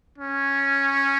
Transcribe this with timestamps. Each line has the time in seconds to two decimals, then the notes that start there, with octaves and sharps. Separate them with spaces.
0.18 C#4